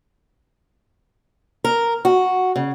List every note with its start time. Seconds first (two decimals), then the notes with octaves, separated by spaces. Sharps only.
1.64 A#4
2.05 F#4
2.56 C#3